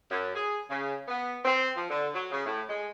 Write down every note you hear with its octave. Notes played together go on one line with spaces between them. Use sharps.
F#2
G#4
C#3
B3
C4
F3
D3
F#3
C#3
A2
G#3